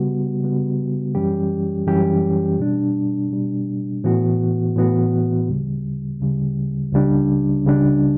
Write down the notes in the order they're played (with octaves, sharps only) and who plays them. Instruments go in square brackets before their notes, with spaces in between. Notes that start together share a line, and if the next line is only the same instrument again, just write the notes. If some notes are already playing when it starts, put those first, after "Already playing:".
Already playing: [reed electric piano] C#3 G3 B3 F#4
C#3 G3 B3 F#4
F#2 E3 G3 C#4 G4
F#2 E3 G3 C#4 G4
B2 G3 D4
B2 G3 D4
A2 E3 B3 F#4
A2 E3 B3 F#4
D2 C#3 G3
D2 C#3 G3
C#2 C#3 G3 D4
C#2 C#3 G3 D4